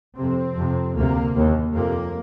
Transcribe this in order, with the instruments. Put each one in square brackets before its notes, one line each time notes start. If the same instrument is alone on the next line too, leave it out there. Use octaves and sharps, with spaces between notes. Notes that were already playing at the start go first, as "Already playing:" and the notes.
[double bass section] F2 C3 C4
F2 C3
D2 C3 A#3
D#2
F2 C3 A#3